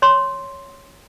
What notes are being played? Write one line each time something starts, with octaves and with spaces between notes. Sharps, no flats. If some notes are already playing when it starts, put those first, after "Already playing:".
C#5 C6